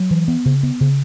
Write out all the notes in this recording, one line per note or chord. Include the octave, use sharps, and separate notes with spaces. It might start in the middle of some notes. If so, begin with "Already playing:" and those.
Already playing: F#3
E3
B3
C#3
B3
C#3